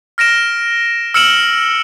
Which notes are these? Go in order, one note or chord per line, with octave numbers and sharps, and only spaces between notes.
F6 A#6 D7 E7
E6 F6 C#7 D7 E7 F#7